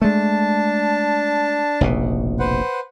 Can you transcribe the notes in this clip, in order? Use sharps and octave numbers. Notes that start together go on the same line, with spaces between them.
G#3 A3 D4 A5
F1 A#1 B2
B4 C5 F#5